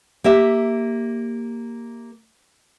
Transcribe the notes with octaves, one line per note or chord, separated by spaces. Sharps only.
A#3 G4 E5